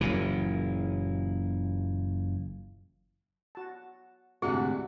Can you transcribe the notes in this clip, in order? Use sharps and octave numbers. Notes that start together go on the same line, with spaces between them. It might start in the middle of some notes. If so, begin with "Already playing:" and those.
F#1 F#2 A#2 E3
F#4 A5
D2 G#2 C3 D4 E4 F#4 G#4 F#5